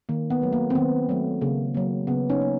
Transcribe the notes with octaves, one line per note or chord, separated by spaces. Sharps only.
D#3 A#3
B3
F#3 A3
A#3
C4
D#3 B3
F#3 A3
C#3 A#3
F#3 A#3
C#3 B3
C#4 D#4
F#3 A#3